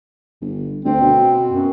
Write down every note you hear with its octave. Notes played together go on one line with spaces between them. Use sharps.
G1
D2 C4
B2
F#2